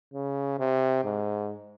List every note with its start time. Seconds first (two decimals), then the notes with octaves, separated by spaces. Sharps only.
0.14 C#3
0.59 C3
1.05 G#2